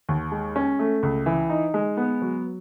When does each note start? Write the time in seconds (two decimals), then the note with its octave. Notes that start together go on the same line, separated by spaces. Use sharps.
0.09 D#2
0.32 G#3
0.56 C#4
0.79 A3
1.03 C#2
1.26 E3
1.50 D#4
1.74 G#3
1.97 B3
2.22 F#3